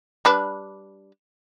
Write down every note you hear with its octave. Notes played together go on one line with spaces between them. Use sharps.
G3 D4 B4